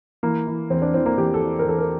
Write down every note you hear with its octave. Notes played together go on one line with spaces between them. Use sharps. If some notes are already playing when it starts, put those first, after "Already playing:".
E3 A#3
E3
E2 C4
D4
E3 C4
A#3
E2 G4
A4
E3
A#4
E2 A4
A#4